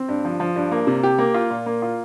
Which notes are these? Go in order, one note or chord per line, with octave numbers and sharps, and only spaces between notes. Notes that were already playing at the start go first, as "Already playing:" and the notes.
Already playing: C4
G2
F3
F3
G2
A#3
C3
G4
A#3
F4
A#2
A#3
F4